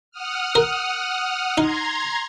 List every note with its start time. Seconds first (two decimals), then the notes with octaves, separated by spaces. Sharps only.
0.11 F#5 D#6 F6
0.55 A#4
1.58 D#4 A#5 C6 G#6